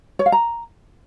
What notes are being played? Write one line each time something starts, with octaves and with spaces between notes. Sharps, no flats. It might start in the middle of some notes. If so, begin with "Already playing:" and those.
C#5
F5
A#5